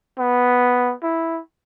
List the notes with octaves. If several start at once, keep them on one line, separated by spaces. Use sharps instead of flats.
B3
E4